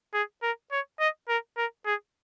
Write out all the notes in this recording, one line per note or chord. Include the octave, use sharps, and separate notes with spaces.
G#4
A#4
C#5
D#5
A#4
A#4
G#4